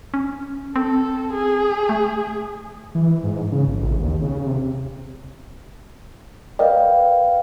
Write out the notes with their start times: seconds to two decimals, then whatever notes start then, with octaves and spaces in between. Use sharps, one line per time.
0.14 C#4
0.76 C4 A4
1.33 G#4
1.89 A3
2.95 E3
3.23 G#2
3.52 C#3
3.67 A#1
3.81 A1
4.02 D#2
4.21 C#3
4.46 C3
6.59 A#4 B4 D5 D#5 F5 G5